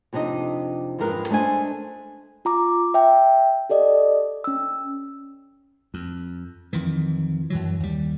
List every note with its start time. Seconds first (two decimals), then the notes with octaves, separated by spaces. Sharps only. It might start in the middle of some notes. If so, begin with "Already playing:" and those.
0.13 F2 C3 D4 D#4 D#5
0.98 F2 G#2 E3 G#3 A#4 B4
1.29 G#3 A3 D4 C5 G#5
2.45 F4 A#5 D6
2.94 E5 G5
3.70 G4 A4 D5 D#5
4.44 C#4 E6
5.94 F2
6.73 F2 D#3 E3
7.50 F#2 E3 F#3
7.80 D#2 G3